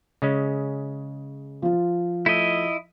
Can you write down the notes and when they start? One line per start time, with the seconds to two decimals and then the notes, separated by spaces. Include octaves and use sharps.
0.22 C#3 G#3 C#4
1.62 F3 F4
2.26 A3 E4 D#5